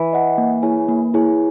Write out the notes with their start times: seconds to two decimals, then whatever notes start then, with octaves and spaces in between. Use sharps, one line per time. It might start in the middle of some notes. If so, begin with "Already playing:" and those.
Already playing: E3
0.13 D#5 F#5
0.38 A#3
0.63 E4 G#4 C#5 G#5
0.88 A#3
1.14 E4 G#4 C#5 G#5